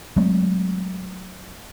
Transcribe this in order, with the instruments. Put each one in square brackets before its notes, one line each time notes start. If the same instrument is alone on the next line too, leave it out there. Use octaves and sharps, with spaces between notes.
[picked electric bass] F#3 G#3 A3 C4